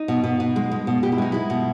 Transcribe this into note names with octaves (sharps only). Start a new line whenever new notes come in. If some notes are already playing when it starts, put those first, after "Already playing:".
Already playing: D#4
B2
B2
B2
G#3
G#3
B2
B2 G4
E4
G#3 D#4
G#3 E4
B2